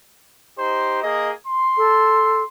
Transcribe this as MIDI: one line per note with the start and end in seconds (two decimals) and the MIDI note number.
0.59 1.01 63
0.59 1.01 67
0.59 1.01 72
1.03 1.32 58
1.03 1.32 68
1.03 1.32 75
1.47 2.46 84
1.77 2.43 69